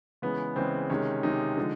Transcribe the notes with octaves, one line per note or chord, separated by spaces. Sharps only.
C#3 E3 G#3 B3
C#3 E3 G#3 C4
C3 D#3 G#3 C#4
C3 D#3 G#3 D#4
D3 F3 G#3